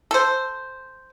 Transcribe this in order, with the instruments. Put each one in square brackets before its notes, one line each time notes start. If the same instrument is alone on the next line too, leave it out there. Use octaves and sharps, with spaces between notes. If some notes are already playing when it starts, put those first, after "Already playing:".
[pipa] A4 C5